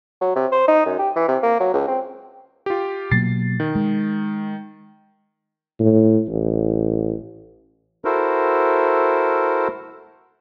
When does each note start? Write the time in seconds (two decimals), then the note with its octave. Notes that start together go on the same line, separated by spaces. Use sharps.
0.21 F#3
0.36 C3
0.52 C5
0.68 D#4
0.86 F#2
0.99 G4
1.16 E3
1.28 C3
1.43 A#3
1.60 F#3
1.74 C#2
1.88 C4
2.66 F4 G4
3.11 B2 F#3 A#3 A6 C7
3.60 D#3
3.75 G#3
5.80 A2
6.28 A1
8.05 E4 F#4 A4 A#4 C5